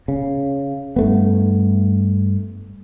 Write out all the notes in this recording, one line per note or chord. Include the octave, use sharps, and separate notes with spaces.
C#3
G2 A3 B3